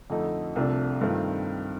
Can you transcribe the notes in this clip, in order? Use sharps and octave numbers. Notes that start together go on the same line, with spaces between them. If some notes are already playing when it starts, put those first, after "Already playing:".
F2 D3 A3 D#4
C2 C3 F3 A3 D4
G2 D#3 A3 C4 F4